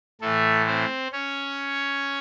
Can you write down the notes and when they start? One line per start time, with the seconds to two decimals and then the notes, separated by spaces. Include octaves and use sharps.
0.21 A2 E3 A3 A4
0.67 C4 C5
1.12 C#4 C#5